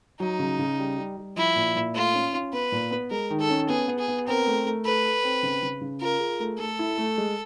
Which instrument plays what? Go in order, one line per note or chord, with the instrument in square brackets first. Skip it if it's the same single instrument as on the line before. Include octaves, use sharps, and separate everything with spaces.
[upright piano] F#3 [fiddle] D#4
[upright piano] C#3
C#3
G3
G3
G3
[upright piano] F3 [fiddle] E4
[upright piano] A#2
A#2
[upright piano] A3 [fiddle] F4
[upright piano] C#4
C#4
[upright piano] B3 [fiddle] B4
[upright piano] A#2
B3
[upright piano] G#3 [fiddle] A#4
[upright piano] D#3
[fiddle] A4
[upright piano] C#4
[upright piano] B3 [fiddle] G#4
[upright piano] B3
[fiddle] G#4
[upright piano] B3
[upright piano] C4 [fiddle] A#4
[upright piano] A3
A3
[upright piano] A4 [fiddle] B4
[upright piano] A4
C4
C#3
C#3
C#3
[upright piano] F4 [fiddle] A#4
[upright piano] G#4
A3
[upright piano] A3 [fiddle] A4
[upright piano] E4
A3
G#3